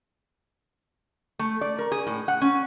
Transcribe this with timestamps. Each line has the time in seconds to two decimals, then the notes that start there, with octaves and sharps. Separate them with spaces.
1.39 A3
1.61 D5
1.79 A#4
1.92 G#4
2.07 A2
2.28 F#5
2.41 C#4